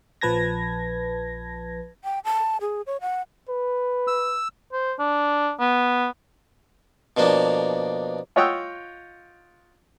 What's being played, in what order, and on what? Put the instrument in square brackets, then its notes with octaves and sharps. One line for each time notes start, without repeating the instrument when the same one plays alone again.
[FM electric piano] A#1 F3 B4 A5 G#6 A#6
[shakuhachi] G5
A5
G#4
C#5
F#5
[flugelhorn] B4
[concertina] E6
[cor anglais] C5
D4
B3
[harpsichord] B2 F3 A#3 D4
[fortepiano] F4 C#5 D#5 F#5 G5 E6